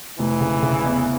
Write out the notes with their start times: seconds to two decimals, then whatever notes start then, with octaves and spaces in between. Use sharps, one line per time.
0.19 F1 E3
0.41 C#3
0.63 C#3
0.84 E2